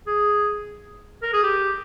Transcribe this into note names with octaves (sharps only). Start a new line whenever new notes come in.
G#4
A#4
G#4
G4